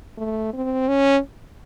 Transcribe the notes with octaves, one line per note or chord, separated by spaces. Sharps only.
A3
C4
C#4